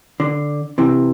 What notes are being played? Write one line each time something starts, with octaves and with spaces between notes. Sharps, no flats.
D3
C3 E3